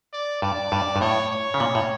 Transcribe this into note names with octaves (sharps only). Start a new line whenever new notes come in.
D5
G2 D5
G2
G2
A2 C#5
C#5
C#3
A#2
A2